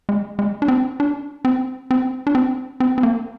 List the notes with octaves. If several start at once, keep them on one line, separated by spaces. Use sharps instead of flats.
G#3
G#3
D4
C4
D4
C4
C4
D4
C4
C4
C4
A#3